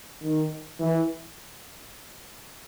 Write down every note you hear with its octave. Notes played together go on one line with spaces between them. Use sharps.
D#3
E3